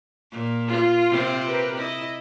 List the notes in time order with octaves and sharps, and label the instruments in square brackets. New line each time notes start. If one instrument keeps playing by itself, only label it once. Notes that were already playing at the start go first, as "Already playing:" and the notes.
[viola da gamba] A#2
[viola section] F4
[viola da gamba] C3 C4
[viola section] G4 A#4 B4
[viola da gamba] E4 [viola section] D#5